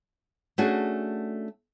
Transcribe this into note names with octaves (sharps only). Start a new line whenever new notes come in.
A3 C#4 D4 F#4 G#4